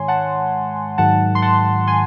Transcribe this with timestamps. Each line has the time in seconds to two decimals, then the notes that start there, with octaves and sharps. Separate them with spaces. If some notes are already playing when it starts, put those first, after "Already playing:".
Already playing: G#2 D#3 G#3 C#5 G#5 C6
0.08 F#5 A5
0.98 G#2 D#3 F#3 F#5 A5
1.35 C6
1.42 F#5 A5
1.87 G#5 C6